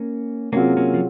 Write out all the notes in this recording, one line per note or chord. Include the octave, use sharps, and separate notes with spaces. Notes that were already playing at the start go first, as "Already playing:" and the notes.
Already playing: A#3 C#4
C3 F#3 A#3 C4 C#4 F4 G#4
A#3 C#4
F3